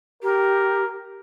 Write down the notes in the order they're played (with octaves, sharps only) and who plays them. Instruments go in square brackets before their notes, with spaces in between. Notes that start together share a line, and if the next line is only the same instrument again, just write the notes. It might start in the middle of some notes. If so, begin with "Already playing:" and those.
[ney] G4 [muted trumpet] A#4